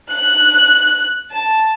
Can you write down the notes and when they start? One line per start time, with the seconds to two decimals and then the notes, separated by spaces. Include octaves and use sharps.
0.11 F#6
1.31 A5